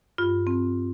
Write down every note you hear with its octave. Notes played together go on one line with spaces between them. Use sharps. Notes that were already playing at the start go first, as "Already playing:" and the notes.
G2 F4
C4